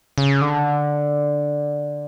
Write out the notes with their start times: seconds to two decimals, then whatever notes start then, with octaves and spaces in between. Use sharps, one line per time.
0.18 C#3
0.42 D3